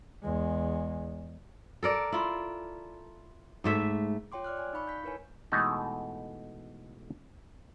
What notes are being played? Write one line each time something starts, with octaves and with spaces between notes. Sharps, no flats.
E2 G#3
A4 A#4 D5
E4 F4
G#2 A3 E5
F4 C#5 G5 C6 D6
D5 D6 F6 F#6
D5 G#5 F#6
D#4 F5 B5 C#6
G6 B6
E4 A#4 B4 C#5 G#5
B2 E3 G#3 A3 D#4 A4